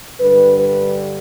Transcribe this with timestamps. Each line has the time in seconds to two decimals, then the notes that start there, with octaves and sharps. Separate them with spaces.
0.20 G2 D3 G3 B4
0.58 B4